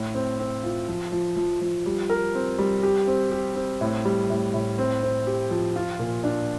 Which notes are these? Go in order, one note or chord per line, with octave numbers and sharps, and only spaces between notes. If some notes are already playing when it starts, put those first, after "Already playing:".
Already playing: A2
C4
C4
F4
F3
F3
F3
F3
G3
A#4
C4
G3
G4
C4
G4
C4
A2
G3
A2
A2
C4
C4
G4
F3
F4
A#2
D4